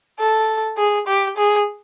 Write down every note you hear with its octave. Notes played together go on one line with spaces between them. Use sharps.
A4
G#4
G4
G#4